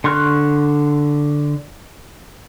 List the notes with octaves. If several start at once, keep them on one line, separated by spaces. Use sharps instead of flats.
D3 C6 C#6 F6 F#6